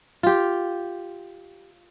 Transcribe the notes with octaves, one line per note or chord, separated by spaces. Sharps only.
F4 G4